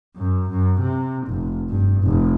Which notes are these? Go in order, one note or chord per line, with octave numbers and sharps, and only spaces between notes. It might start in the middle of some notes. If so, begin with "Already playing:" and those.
F#2
F#2
C3
F1
G2
F1